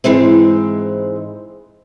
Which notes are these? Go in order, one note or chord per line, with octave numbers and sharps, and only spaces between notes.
G#2 E3 G#3 C4